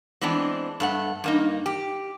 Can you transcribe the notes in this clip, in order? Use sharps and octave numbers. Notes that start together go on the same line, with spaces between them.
E3 G#3 B3 C4 D4
G2 A3 F#5
G2 A#3 D#4
G4